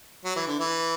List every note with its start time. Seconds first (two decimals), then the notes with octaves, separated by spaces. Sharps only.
0.24 F#3
0.36 E3
0.47 D3
0.60 E3